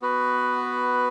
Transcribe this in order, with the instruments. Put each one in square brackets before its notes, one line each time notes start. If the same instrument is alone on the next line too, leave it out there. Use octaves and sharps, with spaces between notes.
[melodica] B3 F#4 B4